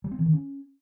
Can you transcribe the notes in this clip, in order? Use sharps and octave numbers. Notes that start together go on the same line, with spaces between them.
G3
C4
E3
D#3
C#4